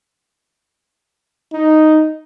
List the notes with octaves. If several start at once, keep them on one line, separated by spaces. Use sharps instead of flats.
D#4